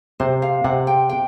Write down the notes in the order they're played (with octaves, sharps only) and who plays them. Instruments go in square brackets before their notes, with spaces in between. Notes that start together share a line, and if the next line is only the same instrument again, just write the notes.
[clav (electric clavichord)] C3 [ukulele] C5
[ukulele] F5
[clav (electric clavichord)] C3 [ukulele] F#5
[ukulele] G5
G5